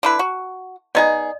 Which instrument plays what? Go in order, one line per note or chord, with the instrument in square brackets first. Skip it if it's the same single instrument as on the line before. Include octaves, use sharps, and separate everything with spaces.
[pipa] D3 E4 B4
F#4
[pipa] B3 D#4 G#4 [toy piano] D5 D#5